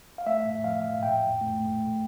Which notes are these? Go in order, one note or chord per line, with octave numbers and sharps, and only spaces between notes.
F5
A3 E5
A2
F3 F5
A2
A#2 G5
A#2
A3
A3
A3